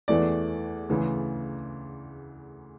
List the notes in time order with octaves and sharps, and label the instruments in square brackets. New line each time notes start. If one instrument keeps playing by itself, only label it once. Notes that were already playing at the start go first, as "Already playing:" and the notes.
[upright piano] E2 E3 A3 D5
D2 C#3 E3